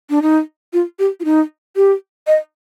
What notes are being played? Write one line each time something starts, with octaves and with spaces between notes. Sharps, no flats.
D4
D#4
F4
G4
F4
D#4
G4
D#5